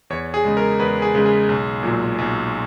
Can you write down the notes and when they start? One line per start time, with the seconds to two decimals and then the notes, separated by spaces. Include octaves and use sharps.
0.10 E2 C#5
0.34 G#4
0.44 C#3 G#3
0.57 A#4
0.79 E2 B4
1.02 G#4
1.15 C#3 G#3
1.26 G#4
1.49 B1
1.83 A#2 F#3
2.18 B1